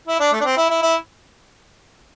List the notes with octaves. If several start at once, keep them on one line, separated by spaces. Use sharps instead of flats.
E4
D4
A3
D4
C4
E4
E4
E4